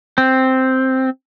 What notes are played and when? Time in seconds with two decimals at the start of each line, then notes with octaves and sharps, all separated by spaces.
0.18 C4